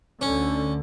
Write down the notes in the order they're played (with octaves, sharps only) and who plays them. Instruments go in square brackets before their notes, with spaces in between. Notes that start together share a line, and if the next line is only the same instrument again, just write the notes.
[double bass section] D2 D3 [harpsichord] C#4